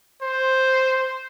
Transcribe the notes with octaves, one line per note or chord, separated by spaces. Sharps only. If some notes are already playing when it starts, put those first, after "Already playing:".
C5